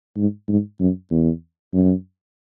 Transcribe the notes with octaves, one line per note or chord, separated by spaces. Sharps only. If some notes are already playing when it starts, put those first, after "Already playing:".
G#2
G#2
F#2
E2
F#2